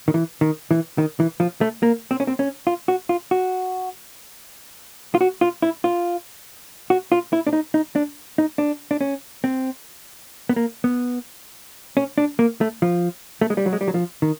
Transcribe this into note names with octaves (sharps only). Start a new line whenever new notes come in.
D#3
E3
D#3
E3
D#3
E3
F3
A3
A#3
C4
C#4
C4
C#4
F4
F#4
F4
F#4
F4
F#4
F4
E4
F4
F#4
F4
E4
D4
D#4
D#4
D4
D#4
D4
D4
C#4
C4
B3
A#3
B3
C#4
D4
A#3
A3
F3
A3
G#3
G3
F#3
G#3
G3
F#3
F3
D#3